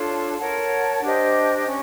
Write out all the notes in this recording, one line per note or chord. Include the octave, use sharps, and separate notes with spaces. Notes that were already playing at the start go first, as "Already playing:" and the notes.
Already playing: D4 F4 A4 C#5
A#4 C#5 F#5 A5
D4 G4 C5 D#5
C#4